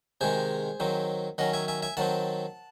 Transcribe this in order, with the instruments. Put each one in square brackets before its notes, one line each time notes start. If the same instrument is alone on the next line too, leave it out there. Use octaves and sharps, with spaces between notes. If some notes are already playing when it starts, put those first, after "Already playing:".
[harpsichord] C3 D#3 G#3 G#4 C5
D#3 F#3 C4
D#3 F#3 C#4 D#5 F#5
E5 G#5
E5 G#5
E5 G#5
D#3 F#3 C4 F#5 A5